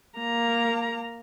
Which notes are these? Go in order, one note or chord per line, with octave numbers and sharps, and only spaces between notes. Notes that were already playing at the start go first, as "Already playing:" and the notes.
A#3 A#5